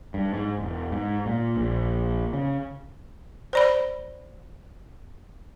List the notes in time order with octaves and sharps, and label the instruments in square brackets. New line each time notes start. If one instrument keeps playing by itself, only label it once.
[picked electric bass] G2
G#2
E1
G#2
A#2
A#1
C#3
[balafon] C5 D5 B5